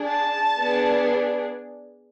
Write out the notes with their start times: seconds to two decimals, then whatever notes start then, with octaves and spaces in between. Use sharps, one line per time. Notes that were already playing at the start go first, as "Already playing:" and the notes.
Already playing: D4 G#4
0.09 A5
0.60 B3 D4 G#4